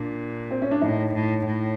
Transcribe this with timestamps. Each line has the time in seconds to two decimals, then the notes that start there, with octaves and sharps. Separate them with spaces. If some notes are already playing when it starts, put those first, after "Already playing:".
Already playing: A#2 D4
0.51 C4
0.62 C#4
0.71 D4
0.81 A2 D#4
1.14 A2
1.46 A2